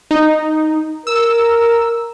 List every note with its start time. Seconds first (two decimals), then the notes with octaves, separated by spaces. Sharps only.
0.11 D#4
1.07 A#4 E6